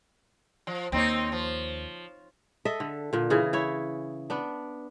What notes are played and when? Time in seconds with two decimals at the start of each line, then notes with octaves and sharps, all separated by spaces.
0.67 F3
0.92 D#2 C4 D#4 C#5
1.32 F3
2.65 A4 D#5 E5
2.80 D3
3.13 A#2 D3
3.30 C#3 E3 G#4
3.53 E4 C#5
4.30 B3 D4